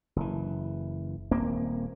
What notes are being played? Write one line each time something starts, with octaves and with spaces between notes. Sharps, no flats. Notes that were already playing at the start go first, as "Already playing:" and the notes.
F#1 E3
D#1 A#3 C4